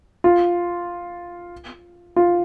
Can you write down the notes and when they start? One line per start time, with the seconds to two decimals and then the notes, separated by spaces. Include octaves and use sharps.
0.24 F4
2.16 F4